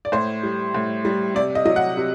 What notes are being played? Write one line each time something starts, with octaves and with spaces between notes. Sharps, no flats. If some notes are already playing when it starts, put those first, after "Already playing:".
D5
A2 C5
G3
A2
G3
C3 D5
D#5
F#3 D#5
F#5
C3